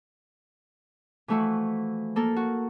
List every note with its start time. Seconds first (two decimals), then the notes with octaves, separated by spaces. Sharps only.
1.28 E3 F3 A3 E4 F#4
2.16 A#3 A4 A#4
2.36 F#4